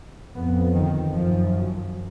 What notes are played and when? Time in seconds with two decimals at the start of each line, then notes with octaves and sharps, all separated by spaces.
0.34 F2 B3
0.74 D#3
1.14 F#2 F3